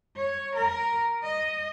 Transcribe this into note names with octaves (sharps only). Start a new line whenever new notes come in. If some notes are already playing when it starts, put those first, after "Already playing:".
C#5
A#4
D#5